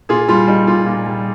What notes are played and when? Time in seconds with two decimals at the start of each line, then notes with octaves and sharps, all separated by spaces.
0.09 A#2 F4 G#4
0.28 G3 F4
0.47 G3 D#4
0.67 A#2 F4
0.86 A#2
1.05 G3